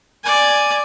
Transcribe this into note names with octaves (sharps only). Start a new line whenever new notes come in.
D5 G#5